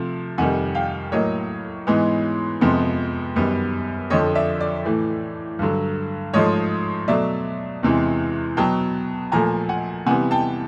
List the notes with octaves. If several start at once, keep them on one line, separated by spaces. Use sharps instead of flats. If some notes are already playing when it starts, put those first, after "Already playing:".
Already playing: C3 F3 A3
F2 C3 D#3 G3 F#5 G#5
F5 G5
A2 F#3 A#3 C#5 D#5
G#2 E3 G#3 B3
F2 C3 F3 G#3 B3
F#2 D#3 G3 B3
F2 D3 F3 C#5 D#5
D5 E5
D5
A2 E3 A3
G2 D3 F#3
G#2 F3 A3 C#5 D#5
B2 F#3 A3 D5 E5
E2 C3 E3 G#3
B2 F#3 B3 G5 A5
A#2 F3 A3 G#5 A#5
F#5 G#5
C3 E3 G3 B3 F#5 G#5
G5 A5